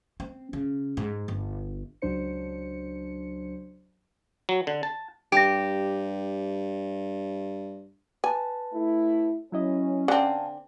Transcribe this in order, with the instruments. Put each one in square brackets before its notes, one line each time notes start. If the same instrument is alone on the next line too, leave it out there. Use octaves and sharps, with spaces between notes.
[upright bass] C4
C#3
G#2
G1
[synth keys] C#2 F#3 D4 C5 C#7
[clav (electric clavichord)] F#3
D3
A5
[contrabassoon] G2 [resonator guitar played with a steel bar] G4 [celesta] A#6 D7
[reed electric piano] B4 A5 [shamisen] G#5
[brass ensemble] A3 E4
[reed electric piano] F#3 E4 D#5 [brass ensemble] C#4
[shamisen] D3 C4 [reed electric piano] F5 G#5 A5